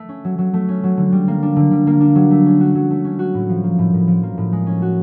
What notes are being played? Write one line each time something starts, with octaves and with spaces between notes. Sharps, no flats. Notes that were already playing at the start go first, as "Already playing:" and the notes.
Already playing: A3
C#4
F#3
F#3
A3
C#4
F#3
D3
G3
A#3
D4
D3
G3
A#3
D4
F#3
A3
C#4
F#4
F#3
A3
C#4
F#4
A2
F3
A#3
A2
A2
F3
A#3
A2
G#3
C#4
F#4